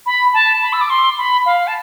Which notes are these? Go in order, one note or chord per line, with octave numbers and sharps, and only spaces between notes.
B5
A5
B5
E6
D6
C6
B5
F5
A5